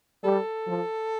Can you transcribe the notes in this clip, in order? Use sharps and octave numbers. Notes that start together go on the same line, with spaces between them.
G3 A4
F3